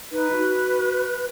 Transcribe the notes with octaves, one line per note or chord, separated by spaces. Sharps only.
D#4 B4
F#4